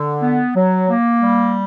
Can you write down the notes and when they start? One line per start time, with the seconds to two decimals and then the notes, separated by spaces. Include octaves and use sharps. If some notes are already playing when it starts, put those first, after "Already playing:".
Already playing: D3
0.22 B3
0.55 F#3
0.88 A#3
1.21 G3